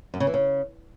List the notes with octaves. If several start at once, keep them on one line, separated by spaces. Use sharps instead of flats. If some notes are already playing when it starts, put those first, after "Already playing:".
F#2
C#3
E3
C#3